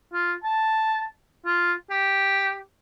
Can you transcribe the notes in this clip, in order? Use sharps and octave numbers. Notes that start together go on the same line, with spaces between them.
F4
A5
F4
G4